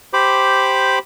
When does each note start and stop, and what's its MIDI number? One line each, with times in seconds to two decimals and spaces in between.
0.13 0.99 67
0.13 0.99 72
0.13 0.99 83
0.13 0.99 86